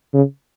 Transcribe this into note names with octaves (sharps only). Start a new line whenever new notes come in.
C#3